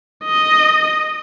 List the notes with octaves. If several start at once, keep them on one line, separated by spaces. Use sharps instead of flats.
D#5